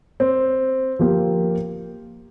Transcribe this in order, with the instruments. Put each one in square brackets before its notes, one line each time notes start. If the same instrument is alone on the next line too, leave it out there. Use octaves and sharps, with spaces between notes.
[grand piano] C4
[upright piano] F3 A#3 G4